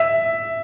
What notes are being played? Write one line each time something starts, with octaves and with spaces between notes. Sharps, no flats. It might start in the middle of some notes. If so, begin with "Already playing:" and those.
Already playing: E5